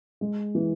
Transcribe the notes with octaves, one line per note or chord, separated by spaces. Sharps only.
G#3
E3